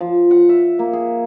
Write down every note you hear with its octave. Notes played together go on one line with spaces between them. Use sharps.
F3
F#5
E5
A#3
G#4